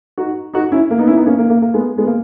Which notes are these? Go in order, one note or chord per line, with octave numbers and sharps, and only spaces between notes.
D#4 F#4
D#4 F#4
C#4 E4
A#3
B3 D#4
C#4 E4
B3 D#4
A#3 C#4
A#3
A#3
A#3
G#3 B3
G#3 B3
A#3